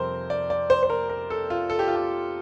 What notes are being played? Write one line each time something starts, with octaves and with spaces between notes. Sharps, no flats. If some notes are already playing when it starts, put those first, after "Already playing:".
Already playing: F2 C3 G3 C4 A#4 C5
D5
D5
C5
C5
A#4
A#4
A4
F4
A4
G4
F4
G4